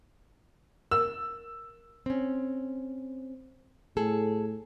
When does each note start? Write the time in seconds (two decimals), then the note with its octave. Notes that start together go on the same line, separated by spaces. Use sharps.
0.91 A#4 E6
2.06 C4 C#4
3.97 A2 G#4 A4